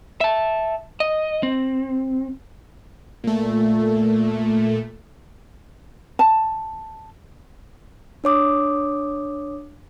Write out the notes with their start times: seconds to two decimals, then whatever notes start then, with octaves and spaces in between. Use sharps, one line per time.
0.21 E5 A5
1.00 D#5
1.43 C4
3.24 A#2 A3
6.19 A5
8.24 D4 C#5 D6 D#6